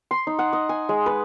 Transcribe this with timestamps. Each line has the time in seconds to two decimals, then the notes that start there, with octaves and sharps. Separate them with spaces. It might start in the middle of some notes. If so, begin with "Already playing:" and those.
0.11 C6
0.27 D#4
0.39 F#5
0.53 D#5
0.69 G#5
0.89 G#3
1.06 B4